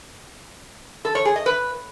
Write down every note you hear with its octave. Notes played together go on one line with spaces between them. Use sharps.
A4
C#5
G#4
D#5
B4